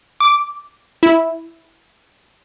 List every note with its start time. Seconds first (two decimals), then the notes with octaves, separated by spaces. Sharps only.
0.20 D6
1.03 E4